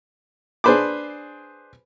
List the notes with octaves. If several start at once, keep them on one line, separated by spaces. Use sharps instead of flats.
D4 G#4 B4 C5 B5 D6